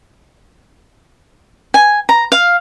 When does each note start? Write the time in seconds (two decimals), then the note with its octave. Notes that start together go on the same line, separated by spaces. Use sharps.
1.74 G#5
2.09 A#5
2.32 F5